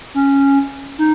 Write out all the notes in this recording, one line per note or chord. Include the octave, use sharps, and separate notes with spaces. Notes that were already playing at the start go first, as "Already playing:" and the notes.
C#4
D#4